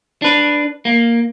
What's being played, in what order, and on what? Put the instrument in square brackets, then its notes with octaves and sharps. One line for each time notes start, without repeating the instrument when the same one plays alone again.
[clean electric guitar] D4 B4
A#3